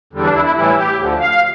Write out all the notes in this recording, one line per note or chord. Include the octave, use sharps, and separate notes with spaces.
E2 D3 G3
D4
E4
E4
A2 E3 G3 E4
G4
D2 D3 F3
F5